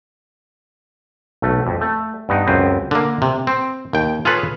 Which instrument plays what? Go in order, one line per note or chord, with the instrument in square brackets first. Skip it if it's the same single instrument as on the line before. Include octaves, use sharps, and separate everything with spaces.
[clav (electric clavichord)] B1 A3
F2
A3
G2 B3 D#4
C#2 F#2 C4 B4
D3 A#3
C3
C4
D#2 G5
F4 G#4 A4 B4 C#5